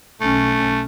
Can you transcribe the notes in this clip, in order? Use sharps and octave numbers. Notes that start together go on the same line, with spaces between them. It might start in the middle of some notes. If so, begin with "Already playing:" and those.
B1 A3 C#4